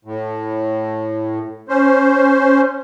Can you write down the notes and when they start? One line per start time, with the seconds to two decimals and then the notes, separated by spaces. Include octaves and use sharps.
0.05 A2
1.69 C#4 C5